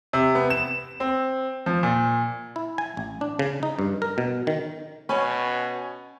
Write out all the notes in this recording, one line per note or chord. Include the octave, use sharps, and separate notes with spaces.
C3
B3
E7
C4
F3
A#2
E4
G#5
A1
D4
C#3
D#4
G2
A#4
B2
D#3
B2 C#4 C#5 G#5 B5